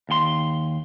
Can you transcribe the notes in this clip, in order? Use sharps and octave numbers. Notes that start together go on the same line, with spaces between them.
D#2 C6